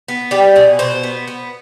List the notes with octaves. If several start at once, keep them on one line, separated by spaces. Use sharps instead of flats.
B3
G3 G4
B2 G#4
B2 C5
B3
B3